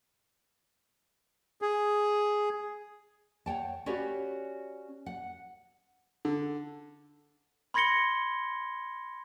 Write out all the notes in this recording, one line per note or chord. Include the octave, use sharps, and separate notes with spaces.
G#4
C#5 F#5 G5 A5
C#4 F#4 G4 B4 C#5 D5
F#5
D3
B5 C6 G#6 A#6 C#7 G7